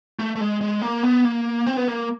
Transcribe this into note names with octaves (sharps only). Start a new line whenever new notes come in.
A3
A3
G#3
G#3
A#3
B3
A#3
C4
B3
A#3